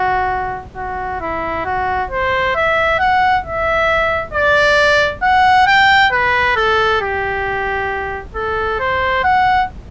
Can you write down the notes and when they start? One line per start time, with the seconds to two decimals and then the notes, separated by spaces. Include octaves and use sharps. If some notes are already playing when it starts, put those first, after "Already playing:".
Already playing: F#4
0.76 F#4
1.21 E4
1.65 F#4
2.11 C5
2.55 E5
2.99 F#5
3.45 E5
4.33 D5
5.23 F#5
5.67 G5
6.12 B4
6.56 A4
7.01 G4
8.35 A4
8.80 C5
9.24 F#5